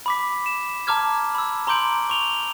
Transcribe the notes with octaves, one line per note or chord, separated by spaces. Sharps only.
B5 D6 B6
E7
A5 A#5 D6 F6 G#6
B5 E6
A#5 C6 D6 G6 D7 F#7
C#6 F7 G7